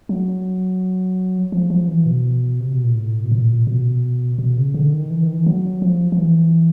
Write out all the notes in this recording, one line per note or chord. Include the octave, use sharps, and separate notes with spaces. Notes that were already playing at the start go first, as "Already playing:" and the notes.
F#3
F3
F3
E3
B2
C3
B2
A#2
A2
B2
A#2
B2
B2
C#3
D3
D#3
E3
D#3
E3
F#3
F3
F3
E3